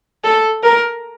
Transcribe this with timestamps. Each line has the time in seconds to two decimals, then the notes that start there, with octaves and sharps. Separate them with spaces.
0.24 A4
0.63 A#4